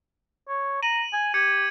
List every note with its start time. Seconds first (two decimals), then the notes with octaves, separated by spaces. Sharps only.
0.49 C#5
0.83 A#5 D#7 F#7
1.13 G#5
1.34 G4 G#6 C#7